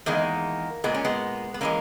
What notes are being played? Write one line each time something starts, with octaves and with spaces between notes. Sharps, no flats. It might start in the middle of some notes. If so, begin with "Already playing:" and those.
E2 D#3 G#3 A#3
A#2 G#3 B3
C#4
G#3 B3
B3
E3 G#3 A#3 C#4